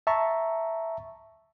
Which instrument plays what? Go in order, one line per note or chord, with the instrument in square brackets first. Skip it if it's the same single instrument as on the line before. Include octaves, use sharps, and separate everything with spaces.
[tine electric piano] E5 A5 A#5 C#6